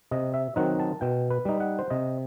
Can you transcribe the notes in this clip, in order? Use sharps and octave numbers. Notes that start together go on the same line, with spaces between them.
C3 D#5
E5
D#3 F#3 C4 D#4 F#5
A5
B2 G5
B4
G3 D#4
F#5
C5
C3 D#5